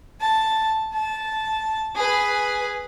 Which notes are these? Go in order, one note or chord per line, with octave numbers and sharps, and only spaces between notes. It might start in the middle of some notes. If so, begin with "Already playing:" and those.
A5
A5
G#4 B4